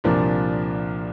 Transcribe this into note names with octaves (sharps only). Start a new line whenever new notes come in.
C2 A#2 F3 D4 A#4